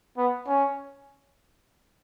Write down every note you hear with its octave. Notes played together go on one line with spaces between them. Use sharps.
B3
C#4